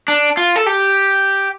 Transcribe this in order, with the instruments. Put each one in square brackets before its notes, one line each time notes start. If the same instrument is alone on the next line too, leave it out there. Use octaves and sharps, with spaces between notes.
[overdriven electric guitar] D4
F4
A4
G4